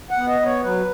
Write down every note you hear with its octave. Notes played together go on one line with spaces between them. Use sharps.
F#5
B3
D#5
B3
C#5
F#3 B4